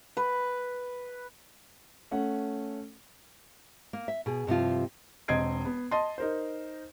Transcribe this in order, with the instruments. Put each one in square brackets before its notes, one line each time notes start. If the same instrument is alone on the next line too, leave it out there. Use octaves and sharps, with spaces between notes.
[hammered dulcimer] B4
[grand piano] A3 C#4 F#5
[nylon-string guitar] A#3
E5
B2 G#4
G2 C3 F3 F4
[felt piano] E1 C4 D#5 G#6 C7 D7
B3
D#5 A5 C6
D#4 A#4 C5